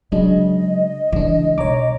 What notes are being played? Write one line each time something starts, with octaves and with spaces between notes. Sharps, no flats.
C#3 F#3 G#3 D4 D#5
C#3 E3 G#3 D4
B1 C#5 A#5 D6